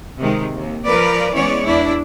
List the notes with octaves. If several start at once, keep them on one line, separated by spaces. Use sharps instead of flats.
C3 D#3 G#3
D#2
F3 A#4 B4 D5
E3 G#3 B3 C#4 C#5 D5
E2 D4 E4 D5